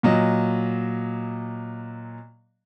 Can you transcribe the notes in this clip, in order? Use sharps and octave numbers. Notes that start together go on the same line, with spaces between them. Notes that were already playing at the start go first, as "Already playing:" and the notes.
A#2 F#3 D#5